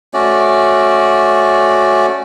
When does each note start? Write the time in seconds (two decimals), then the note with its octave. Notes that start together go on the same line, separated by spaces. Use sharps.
0.14 A3 C#4 F#4 D5